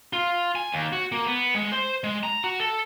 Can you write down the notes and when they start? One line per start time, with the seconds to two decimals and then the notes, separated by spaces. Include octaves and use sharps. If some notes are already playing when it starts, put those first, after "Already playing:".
0.13 F4
0.55 G#5
0.72 D#2
0.92 F#4
1.12 A#3
1.27 B3
1.55 G#3
1.72 C5
2.04 G#3
2.23 A#5
2.44 F#4
2.60 A4